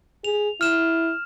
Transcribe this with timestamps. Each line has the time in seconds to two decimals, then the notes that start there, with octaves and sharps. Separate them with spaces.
0.24 G#4 F7
0.61 E4 F6 E7